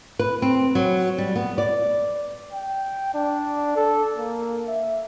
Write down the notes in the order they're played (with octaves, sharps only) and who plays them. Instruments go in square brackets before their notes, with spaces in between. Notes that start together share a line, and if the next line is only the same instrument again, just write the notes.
[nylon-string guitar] B4
C4
F#3
G3
B3
D5
[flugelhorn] G5
D4
A4
A#3
E5